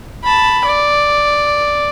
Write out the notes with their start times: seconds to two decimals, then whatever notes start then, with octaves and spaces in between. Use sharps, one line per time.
0.24 A5 B5
0.65 D5